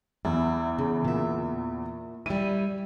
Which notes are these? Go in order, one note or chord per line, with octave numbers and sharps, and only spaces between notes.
E2 E4
C#3
A#2 E5
G3 E4 D#7